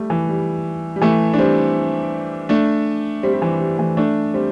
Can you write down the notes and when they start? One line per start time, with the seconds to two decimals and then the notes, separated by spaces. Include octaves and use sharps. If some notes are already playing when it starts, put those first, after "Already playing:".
Already playing: G3 A3
0.10 E3
0.29 G3
0.96 G3
1.02 E3 A3
1.34 D4
1.39 G3 C4
2.49 A3 D4
3.23 G3 C4
3.33 G3
3.42 E3
3.60 G3
3.78 E3 A3
3.97 A3 D4
4.34 G3 C4